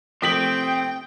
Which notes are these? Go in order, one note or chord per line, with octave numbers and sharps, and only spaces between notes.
C3 F3 A3 C4 G5 D#6 B6 F#7